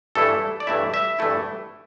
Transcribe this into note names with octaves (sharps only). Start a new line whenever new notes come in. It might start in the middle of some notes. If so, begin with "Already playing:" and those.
G2 E3 A3 E4 A4
D5
G2 E3 A3 E4 E5
E5
G2 E3 A3 E4